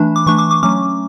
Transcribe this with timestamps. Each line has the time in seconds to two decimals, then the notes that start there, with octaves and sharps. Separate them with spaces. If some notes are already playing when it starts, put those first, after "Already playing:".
Already playing: E3 A3 D4 B5
0.16 D6
0.26 E3 A3 D4 C#6
0.38 D6
0.51 D6
0.63 F#3 A3 C#4 D6